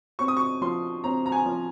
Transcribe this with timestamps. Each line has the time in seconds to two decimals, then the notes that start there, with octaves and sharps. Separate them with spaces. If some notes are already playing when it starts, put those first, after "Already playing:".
0.19 C4 C#6
0.28 D#6
0.37 C#6
0.61 F3 C6
1.04 C4 A#5
1.26 A#5
1.32 G#5
1.45 F3